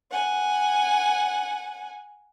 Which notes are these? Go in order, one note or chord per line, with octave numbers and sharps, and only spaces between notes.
F#5 G#5